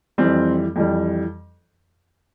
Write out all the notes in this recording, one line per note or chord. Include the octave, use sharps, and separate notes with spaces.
F2 E3 G3 C4
F2 E3 G3